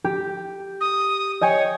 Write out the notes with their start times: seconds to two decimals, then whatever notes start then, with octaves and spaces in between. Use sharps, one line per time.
0.04 G4
0.80 D#6
1.41 C#5 D#5 G5 G#5